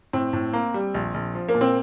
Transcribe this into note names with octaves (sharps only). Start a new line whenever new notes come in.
A2 C4
A2
A#3
G3
A#1
A#1
F3
A#3
A#2
C4